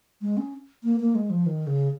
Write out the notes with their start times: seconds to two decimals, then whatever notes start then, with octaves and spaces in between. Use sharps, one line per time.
0.22 G#3
0.37 C#4
0.83 A#3
1.00 A#3
1.15 G#3
1.30 F3
1.46 D#3
1.67 C#3